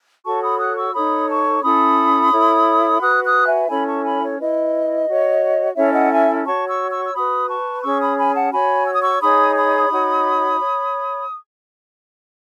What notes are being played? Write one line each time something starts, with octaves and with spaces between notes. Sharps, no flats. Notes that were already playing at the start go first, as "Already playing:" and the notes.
F#4 A4 C#5 A5 C#6
B5 D#6
D#6 F#6
C#6 E6
D#4 A4 C#5 B5 D#6
A5 C#6
C#4 E4 A4 B5 D#6
E4 A4 C#5
F#4 B4 D#6 F#6
D#6 F#6
E5 G#5
C#4 E4 A4 C#5 G#5 B5
A5 C#6
G#5 B5
C#5
E4 B4 D#5
F#4 C#5
C#4 E4 A4 C#5 E5
D#5 F#5
E5 G#5
F#4 C#5 A5 C#6
C#6 E6
C#6 E6
E6
F#4 B4 B5 D#6
A5 C#6
C#4 G#4 C#5 C#6 E6
B5 D#6
G#5 B5
F#5 A5
F#4 C#5 G#5 B5
E6
D#6
C#6 E6
D#4 G#4 C#5 B5 D#6
B5 D#6
D#4 F#4 C#5
C#5